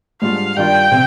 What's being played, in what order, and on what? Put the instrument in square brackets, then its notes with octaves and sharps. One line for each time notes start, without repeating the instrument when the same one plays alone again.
[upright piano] G#2 G3 D4 F4 [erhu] F5
[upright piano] G2 D#3 G3 D4 F4 [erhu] G5
[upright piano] C3